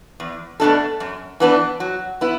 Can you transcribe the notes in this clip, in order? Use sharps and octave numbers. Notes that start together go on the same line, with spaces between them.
E2
B2 A3 D4 A4
F#2
E3 B3 D4
F#3
B3 E4